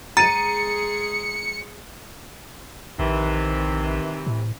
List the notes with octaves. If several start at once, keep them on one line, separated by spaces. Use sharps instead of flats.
G#3 G#4 A#5 A6 C#7 D#7
A#1 C3 D#3 E3
A2